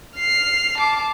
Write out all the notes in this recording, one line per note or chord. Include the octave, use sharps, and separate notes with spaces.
F6 C7
A5 D6